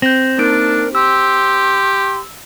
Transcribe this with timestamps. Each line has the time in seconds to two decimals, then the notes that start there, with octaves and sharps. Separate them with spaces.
0.02 C4 G6 A#6
0.38 A#3 D4 D#4 A#4 D7
0.95 G4 C6 E6